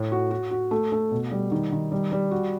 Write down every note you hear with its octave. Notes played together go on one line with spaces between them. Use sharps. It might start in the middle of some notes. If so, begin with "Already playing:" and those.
Already playing: A2
F#4
F#4
F#4
A3
A3
B2
G3
D#3
D#3
G3
G3
F#4